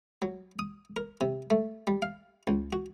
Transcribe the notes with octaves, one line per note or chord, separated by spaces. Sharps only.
F#3
D#6
A#4
C3
A3
G3
F5
C#2
F#4